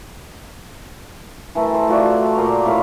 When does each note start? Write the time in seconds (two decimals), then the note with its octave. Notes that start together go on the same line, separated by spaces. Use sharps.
1.55 E3 A3 A4 A#4
1.74 C5
1.88 A3 F4 F#4 D5
2.35 A#2 C5 A#5
2.65 A2 C5 F5 B5